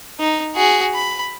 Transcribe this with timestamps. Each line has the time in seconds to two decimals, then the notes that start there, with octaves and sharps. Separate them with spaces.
0.19 D#4
0.56 F#4 G#4
0.94 B5